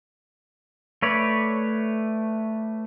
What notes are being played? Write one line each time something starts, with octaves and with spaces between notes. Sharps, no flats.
A3 B4 C#5 D5